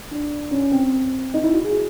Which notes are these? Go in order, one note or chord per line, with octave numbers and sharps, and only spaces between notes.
D4
C#4
C4
D#4
E4
F#4
G#4